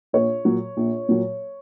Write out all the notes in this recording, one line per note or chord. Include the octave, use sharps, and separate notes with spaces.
A#1 C#5
A#2 F#3
A#1
A#2 F#3